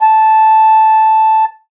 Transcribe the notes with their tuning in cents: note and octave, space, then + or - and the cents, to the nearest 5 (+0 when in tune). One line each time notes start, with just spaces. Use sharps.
A5 -5